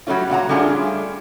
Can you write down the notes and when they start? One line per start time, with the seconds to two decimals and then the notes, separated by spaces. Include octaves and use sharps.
0.07 F#3 G3 A3 C#4 F4
0.30 A#2 F#3 F#5 A#5
0.49 G3 A3 C#4 D4 F4 G#4